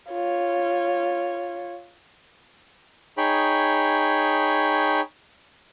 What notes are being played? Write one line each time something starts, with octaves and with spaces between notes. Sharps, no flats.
F4 C#5
D#4 G#4 C#5 G5 B5